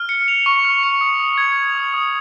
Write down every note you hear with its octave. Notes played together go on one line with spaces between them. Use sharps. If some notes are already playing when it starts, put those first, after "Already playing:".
Already playing: F6
C#7
F7
C#6
F6
C#7
D#6
D#6
G#6
F7
D#6
D#6